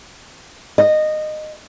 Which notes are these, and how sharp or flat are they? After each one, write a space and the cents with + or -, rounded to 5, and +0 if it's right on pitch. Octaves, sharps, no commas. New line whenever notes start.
D#5 -15